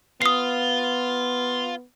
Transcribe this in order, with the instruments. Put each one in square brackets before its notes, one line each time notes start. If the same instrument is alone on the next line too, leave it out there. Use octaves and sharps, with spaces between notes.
[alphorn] B3 [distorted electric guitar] F4 [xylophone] D#6 C7